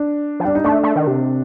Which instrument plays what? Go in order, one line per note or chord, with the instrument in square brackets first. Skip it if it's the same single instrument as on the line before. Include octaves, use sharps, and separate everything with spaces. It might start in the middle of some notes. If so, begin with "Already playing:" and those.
Already playing: [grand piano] D4
[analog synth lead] F3
[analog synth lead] G3 [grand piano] D4
[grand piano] D#4
[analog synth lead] A3 [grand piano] D4
[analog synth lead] A3
D#3
C3